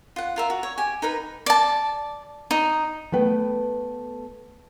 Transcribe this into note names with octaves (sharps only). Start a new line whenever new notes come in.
F4 F#5
F4 A#4 E5
F#4
C#5
G4 G#5
D#4 A#4 B4 B5
D5 A5
D#4
A3 B3 B4 G5